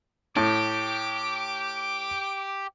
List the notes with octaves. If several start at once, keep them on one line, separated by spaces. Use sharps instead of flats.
A2 G4 D6